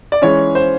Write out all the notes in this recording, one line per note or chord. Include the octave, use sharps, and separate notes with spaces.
D5
E3 G#3 C#4 C#5
C5